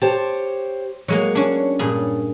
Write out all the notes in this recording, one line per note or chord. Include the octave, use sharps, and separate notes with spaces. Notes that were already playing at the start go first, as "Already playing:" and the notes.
G4 C5 C#5 A5
F#3 G#3 A#3 C#5
C#4 D4
G2 A#2 G#4